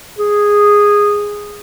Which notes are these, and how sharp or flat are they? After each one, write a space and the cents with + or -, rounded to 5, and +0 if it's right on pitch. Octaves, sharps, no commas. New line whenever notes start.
G#4 -10